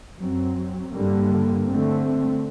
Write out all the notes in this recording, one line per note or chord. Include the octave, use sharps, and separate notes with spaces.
F#2 F#3 C4
G2 D3 G3 A#3
D3 A3 C4